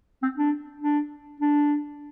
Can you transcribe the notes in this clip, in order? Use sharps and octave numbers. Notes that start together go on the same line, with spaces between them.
C4
D4
D4
D4